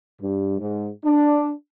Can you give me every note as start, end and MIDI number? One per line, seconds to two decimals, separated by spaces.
0.20 0.57 43
0.58 0.88 44
1.04 1.50 62